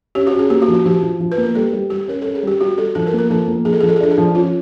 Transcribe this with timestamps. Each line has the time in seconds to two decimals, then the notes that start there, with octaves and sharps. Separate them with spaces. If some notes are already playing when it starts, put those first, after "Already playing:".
0.15 C#4 G4
0.27 F#4
0.33 C#4
0.39 G#4
0.50 A#3 G4
0.62 F#4
0.68 F3
0.74 F#4
0.86 F3 G4
1.03 F3
1.20 F3
1.32 B4
1.38 A#3
1.44 A#4
1.55 G3 A4
1.73 G3
1.90 G3 G4
2.08 C#4 A#4
2.22 C#4 A4
2.35 G#4
2.43 G3 G4
2.61 G3 F#4
2.78 G3 A4
2.95 F3 A4
3.07 A#4
3.13 A#3
3.19 A#4
3.30 F3 A4
3.48 A#3
3.65 F3 G#4
3.73 A4
3.81 F3 G#4
3.89 A4
3.96 G#4
4.01 D4 A4
4.11 G#4
4.18 F3
4.35 C#4 F4